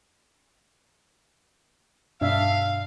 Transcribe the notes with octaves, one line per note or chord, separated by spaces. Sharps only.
G2 B2 D4 E5 F5